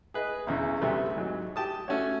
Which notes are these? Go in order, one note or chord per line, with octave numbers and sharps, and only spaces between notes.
G#4 B4 D#5
B1 E2 C#3
D2 C3 G3 A3 B4
G#2 F#3
G4 G5 A5 D#6
A3 C#4 F#4 C#5